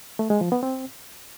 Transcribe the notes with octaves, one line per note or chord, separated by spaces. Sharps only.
A3
G#3
F3
B3
C4